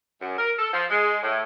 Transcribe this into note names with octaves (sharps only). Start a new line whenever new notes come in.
F#2
A#4
A4
F3
G#3
A2